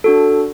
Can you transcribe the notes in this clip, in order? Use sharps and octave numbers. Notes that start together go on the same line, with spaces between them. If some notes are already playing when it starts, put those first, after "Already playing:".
D4 F#4 A4